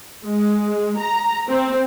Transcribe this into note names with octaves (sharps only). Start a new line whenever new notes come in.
G#3
A#5
C4